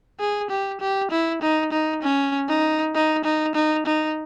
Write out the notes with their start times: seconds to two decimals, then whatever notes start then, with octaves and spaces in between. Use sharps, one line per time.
0.20 G#4
0.50 G4
0.81 G4
1.11 E4
1.42 D#4
1.72 D#4
2.03 C#4
2.49 D#4
2.95 D#4
3.25 D#4
3.55 D#4
3.86 D#4